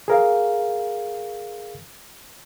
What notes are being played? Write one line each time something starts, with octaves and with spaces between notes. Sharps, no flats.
G#4 A#4 F5